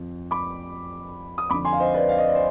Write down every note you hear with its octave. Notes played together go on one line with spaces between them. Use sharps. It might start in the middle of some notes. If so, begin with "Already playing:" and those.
Already playing: F2
B5 D6
D#6
F2 D3 B5 D6
G#5 C6
F5
C5 D#5
B4 D5
F5
D#5
D5
C5